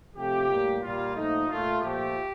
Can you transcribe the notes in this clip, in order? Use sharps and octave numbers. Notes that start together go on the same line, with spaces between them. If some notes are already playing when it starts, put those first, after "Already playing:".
C3 F3 A3 G4
A2 G3 A#3
A#2 G3 A#3 F4
A#2 F3 A3 D#4
A#2 A3 F4
A#2 F3 A3 G4